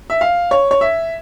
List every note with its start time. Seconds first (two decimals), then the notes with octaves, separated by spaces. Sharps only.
0.10 E5
0.21 F5
0.51 C#5
0.71 C#5
0.81 E5